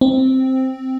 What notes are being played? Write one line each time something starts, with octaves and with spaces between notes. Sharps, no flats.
C4